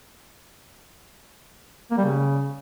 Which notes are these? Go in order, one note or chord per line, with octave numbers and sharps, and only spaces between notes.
A#3
G3
C#3